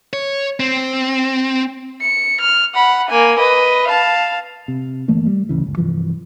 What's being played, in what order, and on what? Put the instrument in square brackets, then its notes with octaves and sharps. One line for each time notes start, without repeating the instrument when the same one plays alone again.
[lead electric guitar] C#5
C4
[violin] C#7
F6
F#5 B5
A#3 G#5
B4 D#5
F5 A5
[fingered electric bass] C3
G1 E3 A3 A#3
G3
A1 D2 C#3 E3
G1 C#2
G2 C3 E3 F3